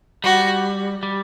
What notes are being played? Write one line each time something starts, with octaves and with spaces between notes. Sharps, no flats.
G3 F#4
G3